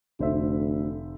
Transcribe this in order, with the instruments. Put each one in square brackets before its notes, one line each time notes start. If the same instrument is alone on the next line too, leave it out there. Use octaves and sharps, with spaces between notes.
[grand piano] F1 C5 E5 [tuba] D2